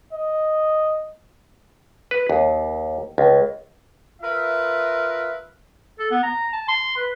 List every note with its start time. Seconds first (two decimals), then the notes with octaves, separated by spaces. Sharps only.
0.12 D#5
2.11 B4
2.29 D#2
3.18 C#2
4.22 F4 A#4 B4 E5
5.99 A4
6.11 B3
6.23 A#5
6.53 A5
6.68 C6
6.97 B4